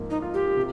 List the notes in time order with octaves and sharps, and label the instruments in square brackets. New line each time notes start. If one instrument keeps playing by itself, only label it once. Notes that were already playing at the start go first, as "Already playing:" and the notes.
Already playing: [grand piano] G#2 F3 A#3
[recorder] D#4
[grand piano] F4
[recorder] G4
[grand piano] C3